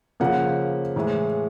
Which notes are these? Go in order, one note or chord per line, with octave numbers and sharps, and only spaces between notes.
C#3 F3 A#3 F#5
A2 E3 G#3